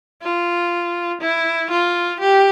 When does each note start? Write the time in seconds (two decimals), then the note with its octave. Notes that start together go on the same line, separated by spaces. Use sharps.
0.23 F4
1.21 E4
1.71 F4
2.20 G4